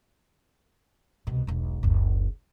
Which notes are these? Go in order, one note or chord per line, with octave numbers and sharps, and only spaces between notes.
C2 B2
E1 B1
F#1 D2